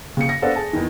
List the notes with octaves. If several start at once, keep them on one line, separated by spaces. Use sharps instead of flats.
C#3 C#7
A#6
B3 D4 A4 C5 F5 F#5
G#4 A5
E2 D#3